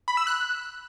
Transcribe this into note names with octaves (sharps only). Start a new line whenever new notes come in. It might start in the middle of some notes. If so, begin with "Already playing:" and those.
B5
E6
F#6